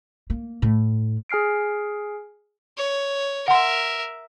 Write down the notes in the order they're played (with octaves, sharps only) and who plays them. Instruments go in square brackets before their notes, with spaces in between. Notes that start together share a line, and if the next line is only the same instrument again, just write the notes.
[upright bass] A#3
A2
[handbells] G#4 G#5 F6 C7 D7
[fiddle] C#5
[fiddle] A#4 E5 [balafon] F#5 C6